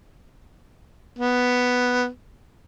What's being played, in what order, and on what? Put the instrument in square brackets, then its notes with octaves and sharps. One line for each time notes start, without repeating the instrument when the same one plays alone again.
[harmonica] B3